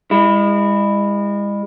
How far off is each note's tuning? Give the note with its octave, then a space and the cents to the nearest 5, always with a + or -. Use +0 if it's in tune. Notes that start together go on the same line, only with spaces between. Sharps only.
G#3 -40 E4 +0